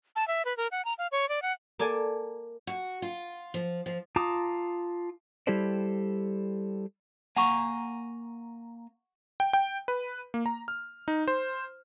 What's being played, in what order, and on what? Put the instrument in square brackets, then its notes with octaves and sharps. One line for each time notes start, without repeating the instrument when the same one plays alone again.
[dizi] A5
E5
B4
A#4
F#5
A#5
F5
C#5
D5
F#5
[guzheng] A#3 A4 D5 G#5 A5
[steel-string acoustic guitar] F#4
F4
F3
F3
[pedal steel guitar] F4 A5 A#5 D6 D#6
[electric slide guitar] G3 E4 G4 A4 C5 D5
[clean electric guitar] A#3 G#5 A#5 [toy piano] F#5 C#6
[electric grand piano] G5
G5
B4
A#3
A#5
F6
D#4
C5